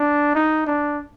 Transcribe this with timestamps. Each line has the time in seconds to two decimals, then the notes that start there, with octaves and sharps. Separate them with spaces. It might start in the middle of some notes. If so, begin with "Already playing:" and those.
Already playing: D4
0.35 D#4
0.66 D4